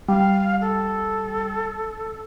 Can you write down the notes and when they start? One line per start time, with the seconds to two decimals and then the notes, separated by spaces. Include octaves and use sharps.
0.09 G3 F5
0.61 A4